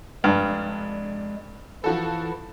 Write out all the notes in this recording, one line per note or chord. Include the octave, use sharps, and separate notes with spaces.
F1 G2 G#3 D4 F6
E3 F3 E4 F#4 A4